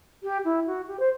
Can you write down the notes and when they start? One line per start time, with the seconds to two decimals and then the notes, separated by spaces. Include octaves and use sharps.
0.23 G4
0.45 E4
0.67 F#4
0.88 G4
0.99 C5